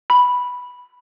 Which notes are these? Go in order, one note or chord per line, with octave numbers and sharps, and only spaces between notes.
B5